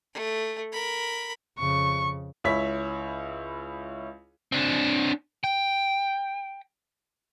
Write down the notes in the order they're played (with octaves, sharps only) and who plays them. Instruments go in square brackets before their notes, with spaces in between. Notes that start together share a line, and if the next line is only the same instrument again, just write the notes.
[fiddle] A3
A#4 B5
[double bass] F2 C#3 [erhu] C#6
[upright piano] C#2 E4 C#5 B6
[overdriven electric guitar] C4 D4
G5